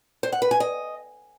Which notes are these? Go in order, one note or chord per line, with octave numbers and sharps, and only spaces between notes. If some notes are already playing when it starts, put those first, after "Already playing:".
C5
F#5
B4
G#5
D#5